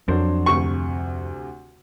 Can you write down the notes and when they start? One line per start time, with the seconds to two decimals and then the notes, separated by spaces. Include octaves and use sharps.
0.08 F2 F#3 D4 C5
0.46 D2 C3 C#6